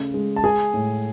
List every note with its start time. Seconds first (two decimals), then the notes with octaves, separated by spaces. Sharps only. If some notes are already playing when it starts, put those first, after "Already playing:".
Already playing: C#3 A3
0.14 G#3
0.36 A5
0.44 G#3 G#4 G#5
0.74 A2